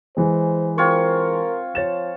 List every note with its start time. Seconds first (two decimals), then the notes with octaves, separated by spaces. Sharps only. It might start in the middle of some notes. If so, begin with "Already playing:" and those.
0.17 E3 G#3 C5
0.78 C4 F4 A#4 C#5
1.75 F3 C#5 A6 E7